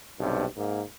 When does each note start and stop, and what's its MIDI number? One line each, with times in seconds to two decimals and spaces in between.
0.20 0.44 35
0.20 0.44 43
0.20 0.44 48
0.56 0.82 44
0.56 0.82 58